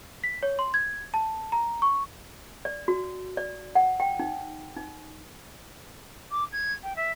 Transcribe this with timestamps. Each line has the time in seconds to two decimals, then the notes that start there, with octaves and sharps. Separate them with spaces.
0.24 B6
0.43 C#5
0.59 C6
0.74 G#6
1.14 A5
1.52 A#5
1.82 C#6
2.65 D5
2.88 F#4
3.37 D5
3.75 F#5
4.00 G5
4.19 D#4
4.77 D#4
6.31 D6
6.52 G#6
6.83 G5
6.96 E5